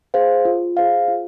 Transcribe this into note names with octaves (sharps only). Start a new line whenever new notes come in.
G#4 C5 F5
F4
G#4 C5 F5
F4